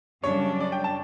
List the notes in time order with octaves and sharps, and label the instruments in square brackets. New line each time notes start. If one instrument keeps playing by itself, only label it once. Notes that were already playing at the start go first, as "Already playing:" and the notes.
[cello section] F#2 C#3 G3 D4 [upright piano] C#5
[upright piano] D5
G5
A5